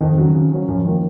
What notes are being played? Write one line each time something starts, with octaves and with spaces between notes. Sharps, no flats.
F2 D#3
C#3 F#3
C#3
F#3 C#4
F#2 F3
D#3 A#3